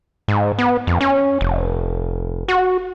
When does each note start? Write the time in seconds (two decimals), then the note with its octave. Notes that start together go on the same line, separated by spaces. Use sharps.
0.28 G#2
0.58 B3
0.87 F2
1.01 C#4
1.41 F1
2.48 F#4